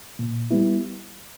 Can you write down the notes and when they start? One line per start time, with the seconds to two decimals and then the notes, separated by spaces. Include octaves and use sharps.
0.19 A#2
0.51 G3 B3 E4